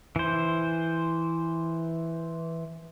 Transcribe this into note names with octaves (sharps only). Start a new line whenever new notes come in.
E3 C5